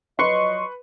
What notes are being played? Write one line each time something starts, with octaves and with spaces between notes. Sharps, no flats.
F3 F#3 B4 D#5 C6 C#6